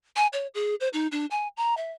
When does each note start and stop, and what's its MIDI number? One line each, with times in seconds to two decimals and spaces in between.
0.16 0.27 80
0.33 0.47 73
0.54 0.75 68
0.80 0.88 72
0.93 1.07 63
1.12 1.26 62
1.31 1.48 80
1.57 1.76 82
1.77 1.92 76